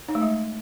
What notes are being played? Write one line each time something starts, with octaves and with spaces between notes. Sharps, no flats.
D#4
A3
G#3